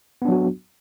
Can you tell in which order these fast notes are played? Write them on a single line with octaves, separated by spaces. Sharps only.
B3 D4 F#3 F#4